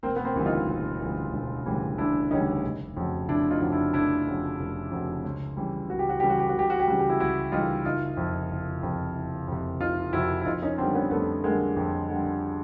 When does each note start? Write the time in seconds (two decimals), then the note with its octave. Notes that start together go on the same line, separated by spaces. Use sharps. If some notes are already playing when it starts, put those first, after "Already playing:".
0.03 E1 A#3 C4
0.16 B3
0.24 A#3 C4
0.35 D2 C#3 E3 G3
0.46 D#4 F4
0.68 E1
1.00 D2 C#3 E3 G3
1.33 E1
1.66 D2 C#3 E3 G3
1.98 E1 D4 E4
2.31 D2 C#3 E3 G3 C#4 D#4
2.63 F1
2.97 F2 C#3 F#3
3.28 F1 D4 E4
3.51 D#4 F4
3.61 F2 C#3 F#3
3.72 D4 E4
3.93 F1 D4 E4
4.27 F2 C#3 F#3
4.59 F1
4.91 F2 C#3 F#3
5.24 C#2
5.57 C#3 E3 G3
5.89 C#2 F#4
5.99 G4
6.09 F#4
6.20 C#3 E3 G3 G4
6.30 F#4
6.40 G4
6.49 F#4
6.54 C#2 G4
6.70 F#4
6.79 G4
6.87 C#3 E3 G3 F#4
6.99 G4
7.09 E4 F#4
7.20 C#2 E4 F#4
7.52 C#3 E3 G3 D#4 F4
7.85 F#1 D#4 F4
8.17 F2 C3
8.50 F#1
8.83 F2 C3
9.15 F#1
9.48 F2 C3
9.81 F#1 D#4 F4
10.13 F2 C3 E4 F#4
10.41 E4
10.46 F2 D#4 F4
10.62 C#4 D#4
10.78 D3 G3 C4 D4
10.94 B3 C#4
11.11 F2 A3 B3
11.44 D3 G3 G#3 A#3
11.76 F2
12.09 D3 G3